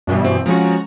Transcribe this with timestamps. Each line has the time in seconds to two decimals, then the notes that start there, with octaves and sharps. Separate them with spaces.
0.07 G2 B2 E3
0.24 C4
0.46 F3 G#3 C#4 F#4 A#5